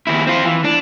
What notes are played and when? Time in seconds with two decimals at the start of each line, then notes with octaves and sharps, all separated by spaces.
0.07 D#2 E4
0.27 C4 F4
0.45 E3
0.64 D4